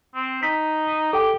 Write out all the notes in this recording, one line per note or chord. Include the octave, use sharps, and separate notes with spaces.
C4
D#4 B6
G4 A4 G5 D6